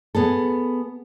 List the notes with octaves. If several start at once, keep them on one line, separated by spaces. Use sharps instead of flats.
B3 G#4 A4